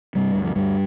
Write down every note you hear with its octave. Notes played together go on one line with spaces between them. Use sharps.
G2 C3 G3
D2
F3
D2 G2 G3